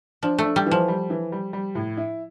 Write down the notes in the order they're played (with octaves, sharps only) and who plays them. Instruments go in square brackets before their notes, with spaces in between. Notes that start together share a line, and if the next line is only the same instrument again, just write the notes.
[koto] F3 [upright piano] D4
[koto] A3
[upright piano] D4
[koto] G3
[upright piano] E3
[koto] F3
[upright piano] G3
E3
G3
G3
A2
E4